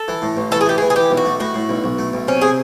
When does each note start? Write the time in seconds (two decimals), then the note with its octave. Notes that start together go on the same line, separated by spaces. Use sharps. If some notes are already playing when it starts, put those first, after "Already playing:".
Already playing: A4
0.08 E3
0.22 A2
0.37 A1
0.51 E3 A4
0.61 G#4
0.66 A3 G4
0.78 E3 G#4
0.90 G#4
0.96 E3 G4
1.10 B1
1.17 F#4
1.25 A3
1.40 A2 F#4
1.54 A2
1.69 B1
1.84 B1
1.98 A3
2.13 B1
2.28 C3 C#4
2.41 C3 G#4